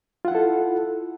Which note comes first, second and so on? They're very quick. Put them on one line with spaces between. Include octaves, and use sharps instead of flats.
F4 F#5 E4 A4